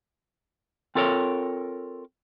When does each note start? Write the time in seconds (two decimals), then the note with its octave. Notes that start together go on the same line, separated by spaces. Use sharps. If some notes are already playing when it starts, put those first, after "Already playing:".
0.95 C4 F4 A4 A#4 C#5